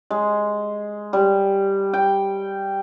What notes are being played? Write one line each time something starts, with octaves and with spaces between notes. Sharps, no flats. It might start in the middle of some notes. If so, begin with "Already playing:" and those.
G#3
G3
G5